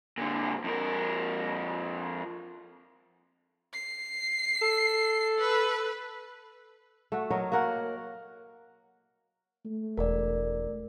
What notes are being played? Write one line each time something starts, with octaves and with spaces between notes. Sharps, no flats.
A#2 D3
F2 A#4
C7
A4
B4
A3 F#4
F#3 A#4 C#5 D#5
A#3 F#4 A#4 F#5
A3
E1 A#4 D5